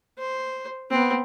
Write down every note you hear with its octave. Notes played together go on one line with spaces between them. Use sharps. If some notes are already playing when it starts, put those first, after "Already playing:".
C5
B3 C4